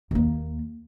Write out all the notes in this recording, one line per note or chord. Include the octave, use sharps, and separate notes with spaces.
D#2 A#3